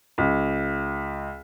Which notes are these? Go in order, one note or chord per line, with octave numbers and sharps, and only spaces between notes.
C#2